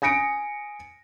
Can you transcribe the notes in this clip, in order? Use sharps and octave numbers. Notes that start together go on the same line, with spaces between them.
G#5 D#6 A#6 C#7 D7